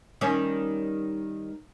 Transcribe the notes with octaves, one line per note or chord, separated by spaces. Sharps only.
D#3 G3 C#4